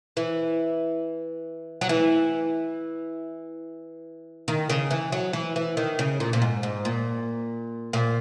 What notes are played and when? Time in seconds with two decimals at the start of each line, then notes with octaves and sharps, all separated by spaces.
0.17 E3
1.81 F#3
1.89 E3
4.48 D#3
4.70 C#3
4.91 E3
5.12 F#3
5.33 E3
5.56 E3
5.77 D#3
5.99 C#3
6.20 A#2
6.33 A#2
6.42 G#2
6.63 G#2
6.85 A#2
7.93 A#2